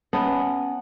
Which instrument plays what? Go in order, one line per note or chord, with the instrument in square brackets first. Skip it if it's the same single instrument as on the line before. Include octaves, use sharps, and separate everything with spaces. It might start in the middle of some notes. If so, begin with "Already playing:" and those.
[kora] B3 [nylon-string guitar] C#4 [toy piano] D#5 E5 A5